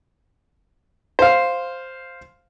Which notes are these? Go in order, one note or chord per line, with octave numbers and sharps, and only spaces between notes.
C5 F5